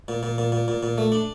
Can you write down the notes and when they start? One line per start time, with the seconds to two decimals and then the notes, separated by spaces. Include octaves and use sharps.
0.08 A#2
0.23 A#2
0.38 A#2
0.52 A#2
0.68 A#2
0.83 A#2
0.98 A3
1.12 D4